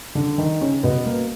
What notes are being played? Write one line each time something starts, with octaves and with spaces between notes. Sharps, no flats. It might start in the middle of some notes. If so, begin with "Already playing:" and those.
D3 D4
D#3 D#4
C#3 C#4
B2 B3
A#3